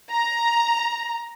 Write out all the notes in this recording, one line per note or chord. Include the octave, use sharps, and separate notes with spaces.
A#5